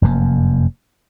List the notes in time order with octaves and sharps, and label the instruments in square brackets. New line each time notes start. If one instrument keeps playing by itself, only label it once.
[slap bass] F1 F#2 A#2 A#3